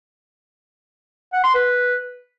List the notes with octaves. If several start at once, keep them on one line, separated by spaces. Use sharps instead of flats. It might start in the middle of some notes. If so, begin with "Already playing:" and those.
F#5
C6
B4